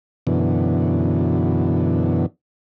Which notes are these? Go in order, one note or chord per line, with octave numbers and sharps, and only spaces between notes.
F#2 B2 D3 E3